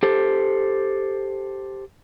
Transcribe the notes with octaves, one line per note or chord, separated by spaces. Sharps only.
G4 A4 C5